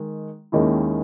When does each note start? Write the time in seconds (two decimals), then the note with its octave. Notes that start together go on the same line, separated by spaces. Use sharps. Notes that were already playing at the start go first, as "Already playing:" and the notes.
Already playing: D#3 G#3
0.52 D#2 D#3 G#3 C#4 E4